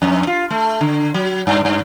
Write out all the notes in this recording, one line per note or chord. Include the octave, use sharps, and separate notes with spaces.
F2
F4
A3
D3
F#3
G2
G2